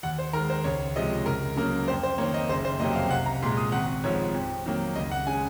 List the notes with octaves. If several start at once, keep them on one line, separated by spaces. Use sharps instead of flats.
D#2 F#5
C5
D#3 G#3 A#4
C5
C#2 C#5
C3 F3 G#3 D#5
C#2 A#4
C#3 F#3 A#3 A#4
F2 C5
C5
D#3 A#3 C#5
D#5
F#1 C5
C5
F2 C3 F#3 A#3 D#5
F5
C2 F#5
A#5
A#2 G#3 C6
D#6
G#1 F#5
G#2 F3 C#5
F2
D#3 F#3 A#3
C#2 D#5
F#5
C#3 G#3 G#5